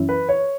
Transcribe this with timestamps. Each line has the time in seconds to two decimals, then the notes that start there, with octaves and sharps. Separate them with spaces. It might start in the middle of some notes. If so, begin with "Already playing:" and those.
Already playing: F#2 E3 C#4 E4
0.09 B4
0.29 C#5